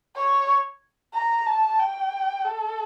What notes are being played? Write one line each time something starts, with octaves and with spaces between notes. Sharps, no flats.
C#5
A#5
A5
G5
A4